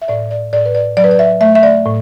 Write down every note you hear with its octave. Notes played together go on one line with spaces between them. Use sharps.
E5
A2 D5
D5
A2 D5
B4
D5
F#3 D5
B4
D5
E5
A3 E5
E5
D5
A2